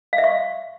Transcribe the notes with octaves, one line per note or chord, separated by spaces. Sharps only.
F5
E5
C#6